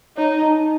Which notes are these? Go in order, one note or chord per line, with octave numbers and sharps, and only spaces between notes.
D#4 C#5
D#4